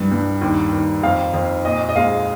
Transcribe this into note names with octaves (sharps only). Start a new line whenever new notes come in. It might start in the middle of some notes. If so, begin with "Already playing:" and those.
Already playing: C2 G2
G2
D#2
D#2
F2 F5
F2
A#2 D#5
D#5
G#3 F5